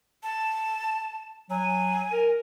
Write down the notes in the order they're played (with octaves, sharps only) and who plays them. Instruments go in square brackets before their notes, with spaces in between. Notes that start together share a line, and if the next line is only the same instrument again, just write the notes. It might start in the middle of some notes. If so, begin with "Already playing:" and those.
[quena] A5
[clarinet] F#3 [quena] G#5
[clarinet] A#4